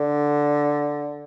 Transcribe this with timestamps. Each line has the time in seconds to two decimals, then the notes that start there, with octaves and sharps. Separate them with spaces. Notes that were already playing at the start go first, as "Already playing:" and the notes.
Already playing: D3